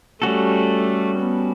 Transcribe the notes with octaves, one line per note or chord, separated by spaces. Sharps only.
G3 A3 C#4 F#4 A4
B3